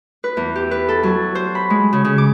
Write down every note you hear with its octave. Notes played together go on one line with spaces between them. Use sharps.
B4
E2
G4
B4
A4
F#3
C5
B5
G#3
C#3
C#3
D6